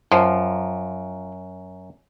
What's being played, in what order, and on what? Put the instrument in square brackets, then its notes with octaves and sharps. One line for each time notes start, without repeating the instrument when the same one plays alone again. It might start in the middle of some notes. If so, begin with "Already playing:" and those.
[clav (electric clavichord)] F#2 [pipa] F3